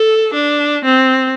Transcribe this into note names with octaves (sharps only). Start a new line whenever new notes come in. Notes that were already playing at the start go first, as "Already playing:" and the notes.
Already playing: A4
D4
C4